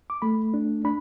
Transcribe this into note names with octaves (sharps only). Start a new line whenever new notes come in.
D6
A3 B5
D4
D4 B5